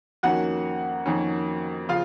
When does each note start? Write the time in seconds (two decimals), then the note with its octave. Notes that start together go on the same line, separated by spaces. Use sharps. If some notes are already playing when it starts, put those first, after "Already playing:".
0.23 F2 D#3 A#3 C#4 F#4 F#5
1.06 F2 D#3 A#3 C#4
1.89 C#3 F3 F4 F5